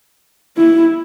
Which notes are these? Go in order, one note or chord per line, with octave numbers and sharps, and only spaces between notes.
E4